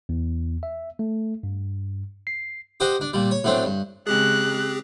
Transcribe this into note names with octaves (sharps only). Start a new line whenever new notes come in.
E2
E5
A3
G2
C7
G4 C5 D#5 F#5
D4
A#2 G3
C#5
A2 F#3 A3 C4 D4
G2
C#3 G#3 C4 G4 G#4 F#6